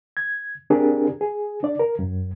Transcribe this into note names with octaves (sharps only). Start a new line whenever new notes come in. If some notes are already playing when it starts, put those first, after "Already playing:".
G#6
C4 D4 G4 G#4 A#4
G#4
D4 D5
A#4
F#2